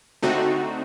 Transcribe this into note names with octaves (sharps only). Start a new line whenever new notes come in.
D3 A3 C4 D#4 F#4